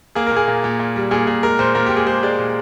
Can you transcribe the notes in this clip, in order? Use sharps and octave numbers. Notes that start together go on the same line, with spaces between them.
A#3 G#4
A#4
A#2
G#4
A#2
A#2
A#2
G3
A#2 G#4
A#2 G#4
G#3 A#4
A#2 C5
A#2 A#4
G4
A#2
G#4
G#3 C5
G#3 D5
A#2